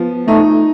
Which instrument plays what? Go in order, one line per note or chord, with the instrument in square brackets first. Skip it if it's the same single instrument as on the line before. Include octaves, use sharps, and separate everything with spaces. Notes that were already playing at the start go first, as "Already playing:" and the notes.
Already playing: [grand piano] F3 B3
[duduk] A3 [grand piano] D#4